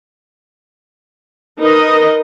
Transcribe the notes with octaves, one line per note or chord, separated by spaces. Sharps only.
D#4 A#4 B4 D#5